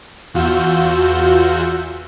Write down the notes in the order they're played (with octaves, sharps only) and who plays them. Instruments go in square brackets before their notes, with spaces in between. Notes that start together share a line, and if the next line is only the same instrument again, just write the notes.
[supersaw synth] E2 F4 F#4 E6 G6